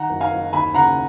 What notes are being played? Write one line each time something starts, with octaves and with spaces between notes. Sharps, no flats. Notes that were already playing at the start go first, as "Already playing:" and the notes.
Already playing: D#3 F#5 A#5
F#1
F5 G#5
F#1
D#2 G#5 B5
C#3 F#5 A#5